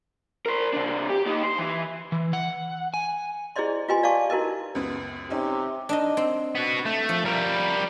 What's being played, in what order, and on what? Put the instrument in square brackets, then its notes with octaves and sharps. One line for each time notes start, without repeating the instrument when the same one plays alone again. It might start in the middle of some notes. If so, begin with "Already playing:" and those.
[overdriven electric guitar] A#4 C5
C3 D4
G4
D#4 G4
C5
E3
[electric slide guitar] E3
F#5
G#5
[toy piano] E4 G#4 C5 D5 D#5 C6
F4 G4 B4 D#5 G#5 C6
D5 F5 A5 C#6 D6
D#4 E4 F#4 A#4 B4 D#5
[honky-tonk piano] C#2 F#2 B3
[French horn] C3 [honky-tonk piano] C#4 D#4
[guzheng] D4 D#4 D#5
C4
[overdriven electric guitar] B3 F#4
A3
[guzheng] F3
[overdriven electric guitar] G3 A#4